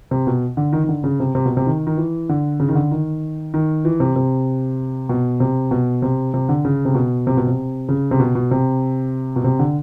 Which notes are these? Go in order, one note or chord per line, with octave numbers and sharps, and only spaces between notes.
C3
B2
D3
D#3
D#3
D3
C#3
C3
C3
B2
C3
D#3
D#3
E3
D3
C#3
D#3
D3
D#3
D#3
E3
C3
C3
B2
C3
B2
C3
C3
D3
C#3
C3
B2
C3
B2
C3
C#3
C3
B2
B2
C3
B2
C3
D3